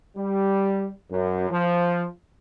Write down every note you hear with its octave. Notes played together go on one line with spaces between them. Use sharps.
G3
F#2
F3